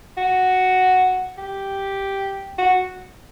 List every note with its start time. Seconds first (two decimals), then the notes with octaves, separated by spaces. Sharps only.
0.17 F#4
1.37 G4
2.58 F#4